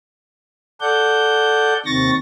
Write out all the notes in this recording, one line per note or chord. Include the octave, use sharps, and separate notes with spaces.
A4 D5 F#5 G6
D#2 C3 D#3 C#6 A6 A#6